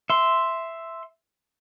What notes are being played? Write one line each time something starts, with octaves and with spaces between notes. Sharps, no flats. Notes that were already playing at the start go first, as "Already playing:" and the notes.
E5 C6